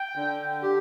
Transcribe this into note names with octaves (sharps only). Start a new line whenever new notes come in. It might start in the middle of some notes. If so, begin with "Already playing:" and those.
Already playing: G5
D3
G4